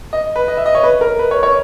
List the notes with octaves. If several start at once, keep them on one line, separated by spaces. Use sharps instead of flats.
D#5
B4
D#5
E5
D#5
C#5
B4
A#4
B4
C#5
C#5